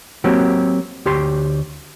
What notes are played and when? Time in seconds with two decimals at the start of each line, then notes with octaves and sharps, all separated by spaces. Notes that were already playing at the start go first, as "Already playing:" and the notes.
0.24 F#3 A#3 C4 F#4 G4
1.05 D2 G4 C#5 C6